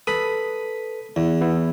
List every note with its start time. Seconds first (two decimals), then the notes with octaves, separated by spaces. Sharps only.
0.07 A4 B4 B5 D#6
1.16 E2 E3
1.41 B3 E4